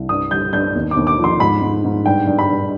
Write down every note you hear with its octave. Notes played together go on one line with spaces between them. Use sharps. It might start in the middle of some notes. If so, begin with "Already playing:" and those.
Already playing: C2
G2 D#6
G3 G6
G2 G6
D#2
D6
D#2
D6
F3
C6
G#2 B5
G#2
G#2
G2 G5
G2
B5
G2